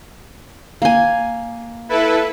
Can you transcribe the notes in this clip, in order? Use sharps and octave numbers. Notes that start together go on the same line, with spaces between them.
A#3 G#5
E4 A4 B4